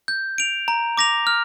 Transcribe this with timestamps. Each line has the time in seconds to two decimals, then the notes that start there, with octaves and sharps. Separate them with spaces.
0.08 G6
0.38 D7 F7
0.68 A#5
0.98 D6 A#6 F7
1.27 F6